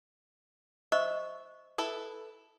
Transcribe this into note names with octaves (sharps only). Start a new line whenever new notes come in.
C5 D#5 E5 C#6
E4 A4 B4